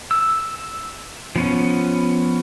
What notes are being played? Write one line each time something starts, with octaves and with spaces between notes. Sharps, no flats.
E6
F3 B3 C#4